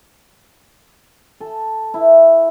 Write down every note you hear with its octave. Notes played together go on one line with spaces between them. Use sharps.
A4
E4